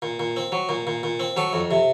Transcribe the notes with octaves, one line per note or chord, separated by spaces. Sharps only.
A#2
A#2
C4
F#3
A#2
A#2
A#2
C4
F#3 A4
F2
C3